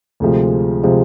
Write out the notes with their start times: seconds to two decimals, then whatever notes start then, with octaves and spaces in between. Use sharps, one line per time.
0.20 D2 C3 F3 G#3
0.83 C3 F3 G#3